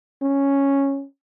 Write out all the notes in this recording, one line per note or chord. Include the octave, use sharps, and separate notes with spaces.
C#4